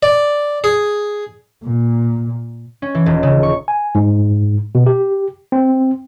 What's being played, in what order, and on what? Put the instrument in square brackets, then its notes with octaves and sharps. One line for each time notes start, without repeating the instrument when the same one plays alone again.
[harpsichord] D5
G#4
[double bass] A#2
[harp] C#4
E3
D#1
C#3
C#6
[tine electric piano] G#5
G#2
B2
G4
C4